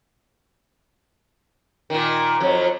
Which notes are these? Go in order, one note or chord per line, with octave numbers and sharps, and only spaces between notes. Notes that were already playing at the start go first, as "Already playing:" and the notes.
A#2 D#3
F2 F#3